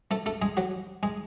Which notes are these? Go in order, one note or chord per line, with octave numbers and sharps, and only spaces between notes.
A3 A4
A3 A4
G#3 G#4
F#3 F#4
G#3 G#4